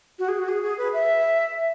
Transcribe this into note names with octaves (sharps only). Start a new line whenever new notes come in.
F#4
G#4
F#4
G#4
G#4
B4
E5